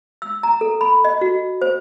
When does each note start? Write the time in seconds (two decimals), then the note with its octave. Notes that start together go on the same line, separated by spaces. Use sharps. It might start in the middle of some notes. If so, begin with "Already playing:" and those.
0.22 E6
0.43 A#5
0.61 A4
0.81 B5
1.05 D#5
1.21 F#4
1.62 C5